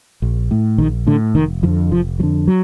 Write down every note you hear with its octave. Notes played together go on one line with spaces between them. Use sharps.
A#1
A2
A#1 D#3
A2 D3
F1 D#3
F2 D3 E3
F1 F3
F2 D3 F#3
F#3